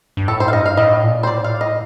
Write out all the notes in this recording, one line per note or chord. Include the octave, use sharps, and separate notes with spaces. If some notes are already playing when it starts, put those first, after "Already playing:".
G2
A2 A4
C5
F5
G2 D#5
F5
A2 D#5
A#2
C5
A2 D5
F5
D#5